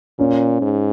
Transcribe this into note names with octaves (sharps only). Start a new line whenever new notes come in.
A#2 C#4
G#2